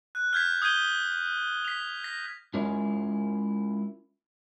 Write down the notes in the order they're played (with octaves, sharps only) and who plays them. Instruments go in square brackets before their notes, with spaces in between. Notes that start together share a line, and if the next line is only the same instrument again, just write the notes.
[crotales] F#6
F6 G6 G#6 B6
D#6 G6 G#6 B6 D#7 G7
B6 F7
A#6 B6
[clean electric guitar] G#3 C#4 E4 F4 A#4 C#5